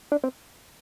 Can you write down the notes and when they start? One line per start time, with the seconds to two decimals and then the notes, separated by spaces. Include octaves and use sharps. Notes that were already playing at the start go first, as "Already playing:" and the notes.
0.12 D4
0.24 C4